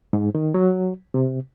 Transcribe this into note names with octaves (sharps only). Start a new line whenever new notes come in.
G#2
D#3
F#3
C3